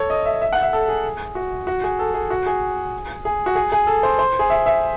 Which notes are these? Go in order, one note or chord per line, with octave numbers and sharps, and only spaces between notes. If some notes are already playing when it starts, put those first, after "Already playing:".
Already playing: A4 C#5
D#5
E5
E5
F#5
E5
A4
G#4
F#4
F#4
G#4
A4
G#4
F#4
G#4
G#4
F#4
G#4
G#4
A4
C5
C5
G#4
E5
E5